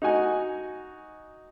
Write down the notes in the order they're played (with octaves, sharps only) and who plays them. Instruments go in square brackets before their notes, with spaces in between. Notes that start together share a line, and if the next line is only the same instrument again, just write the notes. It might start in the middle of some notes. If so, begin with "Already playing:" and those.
[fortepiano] D#4 F#4 G#5